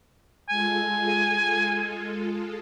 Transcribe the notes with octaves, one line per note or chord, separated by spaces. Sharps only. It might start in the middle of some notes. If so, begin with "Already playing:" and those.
G#3 F4 A4 G#5